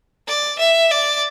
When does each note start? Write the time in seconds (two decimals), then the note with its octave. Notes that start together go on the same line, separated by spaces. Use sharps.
0.27 D5
0.59 E5
0.91 D5